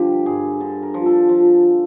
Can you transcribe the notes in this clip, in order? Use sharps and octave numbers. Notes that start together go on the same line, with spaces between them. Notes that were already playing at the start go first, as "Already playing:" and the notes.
Already playing: G2 D3 F3 G4
G2 G#4
D3 A4
A#4
F3
A4
F3